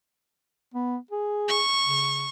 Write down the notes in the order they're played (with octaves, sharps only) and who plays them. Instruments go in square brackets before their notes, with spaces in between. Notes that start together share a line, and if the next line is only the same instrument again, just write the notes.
[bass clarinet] B3
G#4
[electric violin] C#6
[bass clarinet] C#3